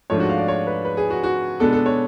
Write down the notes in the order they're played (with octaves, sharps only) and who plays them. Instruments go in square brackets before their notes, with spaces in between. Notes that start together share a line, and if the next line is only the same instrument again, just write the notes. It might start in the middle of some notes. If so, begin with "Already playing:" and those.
[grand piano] G#2 F3 A3 D4 C#5
F#4
F5
D5
C#5
B4
B4
G#4
F#4
F#4
B2 G#3 B3 D4 A4
A4
C#5